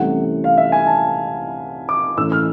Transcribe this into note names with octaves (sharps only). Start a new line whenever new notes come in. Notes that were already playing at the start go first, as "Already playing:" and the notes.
Already playing: C2 C3 E3 A3 C#4 F#5
F5
E5
G#5
A5
D6
A2 E3 A3 C#4 E6
F6